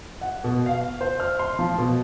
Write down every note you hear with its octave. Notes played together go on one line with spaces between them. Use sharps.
F#5
B2
F5
C5
F6
C6
F3
B2